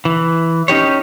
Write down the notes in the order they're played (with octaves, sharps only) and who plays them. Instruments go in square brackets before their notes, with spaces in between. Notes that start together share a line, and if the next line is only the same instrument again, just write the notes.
[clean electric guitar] E3
C#4 D#4 G4 C#5